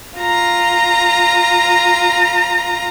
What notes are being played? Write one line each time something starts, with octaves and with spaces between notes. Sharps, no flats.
F4 A#5